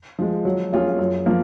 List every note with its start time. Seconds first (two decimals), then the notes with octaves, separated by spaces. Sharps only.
0.19 F3 G#3
0.45 F#3
0.73 A#3 C#4 F4 G#4
0.99 F#2
1.26 F3 A#3